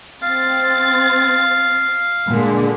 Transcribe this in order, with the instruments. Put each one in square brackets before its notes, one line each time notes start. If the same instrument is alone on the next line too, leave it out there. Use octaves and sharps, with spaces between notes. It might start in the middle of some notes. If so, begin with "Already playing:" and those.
[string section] C4 A6 [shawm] F5
[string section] A#2 D3 G#3